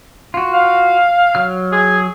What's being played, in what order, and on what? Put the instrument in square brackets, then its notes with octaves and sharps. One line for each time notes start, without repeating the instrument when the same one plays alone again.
[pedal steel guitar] F4 F#4
[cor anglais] F5
[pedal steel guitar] F#3 F6
[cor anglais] G#4